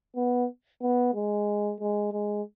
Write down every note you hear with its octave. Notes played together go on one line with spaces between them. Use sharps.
B3
B3
G#3
G#3
G#3